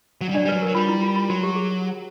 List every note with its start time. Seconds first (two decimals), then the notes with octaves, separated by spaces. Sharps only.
0.21 F#3
0.29 G3
0.34 F#3 D4 D5
0.45 G3
0.49 F#3 B4
0.62 F#3 A#4
0.75 G3 F4
0.88 E4
1.02 F4
1.16 F4
1.30 F#3 F#4
1.43 G4
1.56 G#4